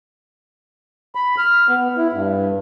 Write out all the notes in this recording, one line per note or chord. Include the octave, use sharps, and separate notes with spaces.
B5
F6
B3
E4
G2